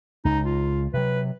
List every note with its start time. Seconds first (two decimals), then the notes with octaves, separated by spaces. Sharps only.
0.25 C#2 D#4
0.45 F4
0.94 C3 F#3 B4